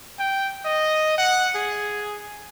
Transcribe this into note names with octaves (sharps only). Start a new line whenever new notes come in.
G5
D#5
F#5
G#4